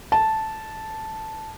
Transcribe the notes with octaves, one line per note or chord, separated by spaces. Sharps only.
A5